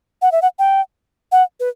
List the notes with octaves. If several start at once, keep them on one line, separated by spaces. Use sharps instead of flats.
F#5
E5
F#5
G5
F#5
B4